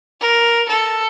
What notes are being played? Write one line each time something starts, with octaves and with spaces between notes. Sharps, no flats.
A#4
A4